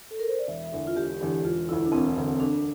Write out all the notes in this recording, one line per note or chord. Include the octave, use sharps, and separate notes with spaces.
A4
A#4
C5
D5
E1 E5
E2 D3
F4
E1 G4
E2 D3
E1 F4
D2 D3 E4
D4
E1 C4
D2 D3
D3 D4